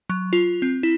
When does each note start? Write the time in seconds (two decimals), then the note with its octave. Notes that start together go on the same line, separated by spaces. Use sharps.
0.09 F#3
0.33 F4
0.62 C4
0.83 E4